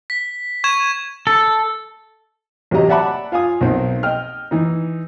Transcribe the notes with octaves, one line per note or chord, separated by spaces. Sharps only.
B6
C#6 G#6 E7
A4
A1 C3 F#3 G4 D#5 A#5
D5 E5 F#5 A5 B5 D6
F4 F5 G#5 D#6
B1 A#3 C4 D#4
D#5 G5 F6
E3 D#4